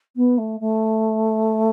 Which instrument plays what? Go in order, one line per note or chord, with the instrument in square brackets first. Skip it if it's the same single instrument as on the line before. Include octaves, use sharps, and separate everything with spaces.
[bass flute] B3
A3
A3